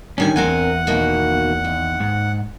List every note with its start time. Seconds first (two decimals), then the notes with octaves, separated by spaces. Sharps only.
0.18 D2 D#3 G3 C#4 G#5
0.36 E2 C4 A#4 F#5 G#5
0.87 B2 D#3 A#3
1.64 D#2
2.00 G#2